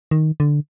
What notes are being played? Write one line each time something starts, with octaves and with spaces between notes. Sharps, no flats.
D#3
D3